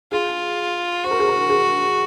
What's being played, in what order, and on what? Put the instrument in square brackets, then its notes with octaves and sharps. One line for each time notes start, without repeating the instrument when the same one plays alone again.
[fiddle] F4 [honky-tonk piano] G#4
[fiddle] F#4 [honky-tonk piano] C5
[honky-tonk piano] A#4
G#4
A#4
G#4